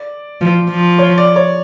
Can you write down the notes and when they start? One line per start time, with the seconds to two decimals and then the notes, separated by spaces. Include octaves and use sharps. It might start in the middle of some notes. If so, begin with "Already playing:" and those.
Already playing: D5
0.41 F3
0.70 F3
0.98 C#5
1.18 D5
1.36 C#5